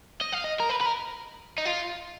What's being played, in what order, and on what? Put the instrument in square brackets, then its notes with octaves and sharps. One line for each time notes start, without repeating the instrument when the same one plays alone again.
[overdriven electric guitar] D#5
F5
D#5
A#4
B4
B4
A#4
D#4
F4